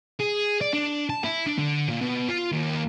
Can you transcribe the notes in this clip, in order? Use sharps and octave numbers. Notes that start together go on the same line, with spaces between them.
G#4
D5
D4
A5
E4
D4
D3
A#2
B2
F4
D#2